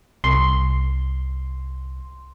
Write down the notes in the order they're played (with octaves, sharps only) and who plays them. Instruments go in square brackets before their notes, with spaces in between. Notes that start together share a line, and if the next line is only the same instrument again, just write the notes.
[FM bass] C2 [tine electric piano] C6